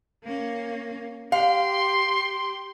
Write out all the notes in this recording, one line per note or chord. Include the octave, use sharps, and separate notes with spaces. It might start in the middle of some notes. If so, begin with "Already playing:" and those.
A#3 C#4
G4 F5 C6